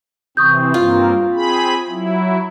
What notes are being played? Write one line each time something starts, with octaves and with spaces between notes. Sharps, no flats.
C3 E3 C4 C#6 D#6 G6
G2 A#3 C4 F4
C4 G#4 B5
F#3 E4